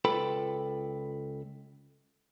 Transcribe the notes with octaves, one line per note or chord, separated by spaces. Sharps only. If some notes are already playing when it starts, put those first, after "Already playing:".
C#2 F4 A4 B4 G5 B5